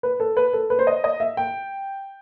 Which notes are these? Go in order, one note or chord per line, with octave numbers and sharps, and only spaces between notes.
B4
A4
B4
A4
B4
C5
D#5
D#5
E5
G5